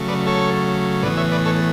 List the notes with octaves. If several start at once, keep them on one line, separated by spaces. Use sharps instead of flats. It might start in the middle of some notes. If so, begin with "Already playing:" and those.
Already playing: C#3 F#3 A3
B4 D5
A4 C#5
A2 E3 B3 B4 D5
C#5 E5
B4 D5
A4 C#5